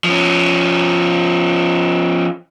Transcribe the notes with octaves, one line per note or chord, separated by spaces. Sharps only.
F3 C#4